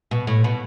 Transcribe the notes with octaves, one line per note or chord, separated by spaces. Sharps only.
B2
A2
B2